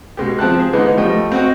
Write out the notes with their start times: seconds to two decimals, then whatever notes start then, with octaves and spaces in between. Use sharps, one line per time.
0.17 B2 G#3 G4
0.39 F3 C4 A5 F#6
0.59 G#4
0.73 D3 E3 G#3 B3 D#4
0.97 F3 G3 A3 D#5 G5
1.32 C4 F#4 D#5